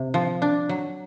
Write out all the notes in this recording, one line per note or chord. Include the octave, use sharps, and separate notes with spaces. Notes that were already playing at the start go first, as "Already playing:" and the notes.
Already playing: C3
F3
D4
F#3